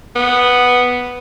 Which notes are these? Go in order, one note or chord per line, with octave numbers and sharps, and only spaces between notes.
B3